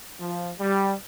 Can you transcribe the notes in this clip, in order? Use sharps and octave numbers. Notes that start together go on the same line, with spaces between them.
F3
G3